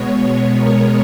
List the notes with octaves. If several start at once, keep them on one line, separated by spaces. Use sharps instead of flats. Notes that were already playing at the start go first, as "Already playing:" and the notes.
Already playing: B2 G#3 B3 C#5
A#4